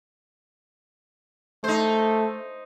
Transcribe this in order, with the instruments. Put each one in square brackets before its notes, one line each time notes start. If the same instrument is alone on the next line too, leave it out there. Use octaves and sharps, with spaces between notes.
[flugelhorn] A3 [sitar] D#4 C5